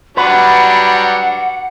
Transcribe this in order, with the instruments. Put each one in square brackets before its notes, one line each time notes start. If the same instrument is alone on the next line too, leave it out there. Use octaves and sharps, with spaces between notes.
[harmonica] F#3 G3 D4 [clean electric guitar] B4 [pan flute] F#5